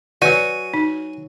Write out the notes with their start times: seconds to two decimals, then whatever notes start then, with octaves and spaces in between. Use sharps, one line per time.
0.22 F#3 F#4 B4 D5 G#5
0.74 D#4